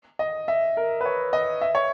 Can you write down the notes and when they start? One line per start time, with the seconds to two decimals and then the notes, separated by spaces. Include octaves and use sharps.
0.19 D#5
0.48 E5
0.77 A#4
1.01 B4
1.05 C#5
1.33 D#5
1.61 E5
1.75 C#5